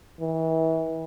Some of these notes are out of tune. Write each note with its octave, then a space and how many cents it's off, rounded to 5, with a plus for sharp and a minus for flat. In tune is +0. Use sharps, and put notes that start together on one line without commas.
E3 -30